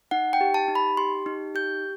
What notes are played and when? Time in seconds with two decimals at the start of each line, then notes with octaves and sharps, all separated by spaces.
0.11 D#4 F#5
0.33 G5
0.41 G4
0.54 A5
0.68 D#4
0.75 B5
0.97 G4 C6
1.26 D#4
1.55 G4 G6